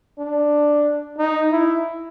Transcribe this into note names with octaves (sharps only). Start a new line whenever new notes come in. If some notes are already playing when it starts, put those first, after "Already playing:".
D4
D#4
E4